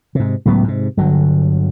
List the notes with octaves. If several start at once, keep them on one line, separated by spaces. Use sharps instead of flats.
G#2 C3
C#2 A2 F#3 B3
G#2 C3
G1 D3 F#3